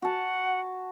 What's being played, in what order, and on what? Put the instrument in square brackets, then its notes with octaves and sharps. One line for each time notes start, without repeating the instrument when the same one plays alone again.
[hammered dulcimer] F#4 A5 [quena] F#5